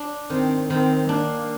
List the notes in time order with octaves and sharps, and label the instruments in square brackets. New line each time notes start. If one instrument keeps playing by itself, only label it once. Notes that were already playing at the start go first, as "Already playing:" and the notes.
Already playing: [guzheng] D4
[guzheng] D#3 [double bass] C4
[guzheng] D#3 [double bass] C4
[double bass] A#3 [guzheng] D4